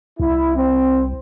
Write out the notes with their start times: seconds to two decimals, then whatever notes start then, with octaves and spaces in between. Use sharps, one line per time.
0.20 C2 E4
0.56 C4